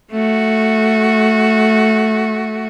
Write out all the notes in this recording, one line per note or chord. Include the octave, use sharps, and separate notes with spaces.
A3 F#4